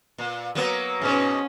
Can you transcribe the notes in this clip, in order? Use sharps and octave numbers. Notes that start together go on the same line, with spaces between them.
A#2
F#3 A#3 B3
G#2 B2 C#4